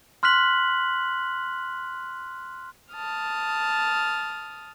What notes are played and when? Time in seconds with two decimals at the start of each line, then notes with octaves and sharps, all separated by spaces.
0.23 C6 F6 F#6 B6 F#7
2.92 A5 D#6 F6